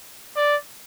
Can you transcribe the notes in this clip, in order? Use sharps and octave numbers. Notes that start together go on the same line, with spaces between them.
D5